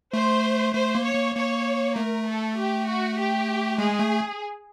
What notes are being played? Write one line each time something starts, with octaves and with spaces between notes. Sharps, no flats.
A3 C5
A3 C5
A#3
C#5
A#3
A#3 C#5
A3 A#4
A4
G4
F#4
G4
G#3 G#4
A3